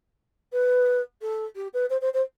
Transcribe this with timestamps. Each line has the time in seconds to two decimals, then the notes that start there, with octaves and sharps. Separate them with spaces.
0.53 B4
1.22 A4
1.56 G4
1.74 B4
1.90 C5
2.01 C5
2.14 C5